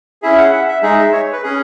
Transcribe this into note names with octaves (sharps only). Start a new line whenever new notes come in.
C#4 E4 G#4 E5
F#5
E5
E5
G#3 D#4 G#4 E5
E5
C#5
B4
C#4 G#4